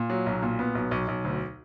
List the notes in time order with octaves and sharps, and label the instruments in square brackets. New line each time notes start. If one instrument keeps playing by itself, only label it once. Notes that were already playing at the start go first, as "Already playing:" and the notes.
Already playing: [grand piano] A#2
F#3
B1
A#2
B3
B1
B1
B1
D2